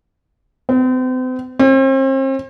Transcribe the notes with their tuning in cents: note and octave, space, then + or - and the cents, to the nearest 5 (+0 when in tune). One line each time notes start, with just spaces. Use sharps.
C4 -40
C4 +40